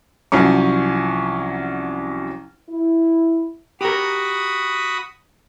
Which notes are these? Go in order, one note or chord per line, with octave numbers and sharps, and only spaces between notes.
C2 F3 F#3 C#4 C#6
E4
F#4 G4 A#4 B5 D#6